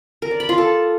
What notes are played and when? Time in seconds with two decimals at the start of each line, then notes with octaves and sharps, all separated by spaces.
0.22 A#4
0.31 D5
0.40 B5
0.49 F4
0.58 A4